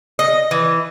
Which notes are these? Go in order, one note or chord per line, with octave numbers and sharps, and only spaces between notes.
D#5
E3